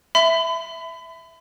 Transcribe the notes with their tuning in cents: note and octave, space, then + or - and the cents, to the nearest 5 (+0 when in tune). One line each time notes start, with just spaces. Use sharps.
E5 +0 B5 +35